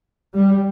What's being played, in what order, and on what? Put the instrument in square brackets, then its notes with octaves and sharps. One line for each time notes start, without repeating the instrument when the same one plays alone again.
[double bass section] G3